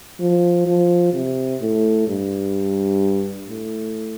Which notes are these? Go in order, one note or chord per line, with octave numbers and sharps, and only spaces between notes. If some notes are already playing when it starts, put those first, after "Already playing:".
F3
F3
C3
A2
G2
A2